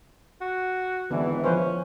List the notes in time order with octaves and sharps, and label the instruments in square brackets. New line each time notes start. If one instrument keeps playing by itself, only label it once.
[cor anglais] F#4
[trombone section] G#1 E3 [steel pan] D3 B3 D4
[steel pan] F3 B4 C5 [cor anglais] C#4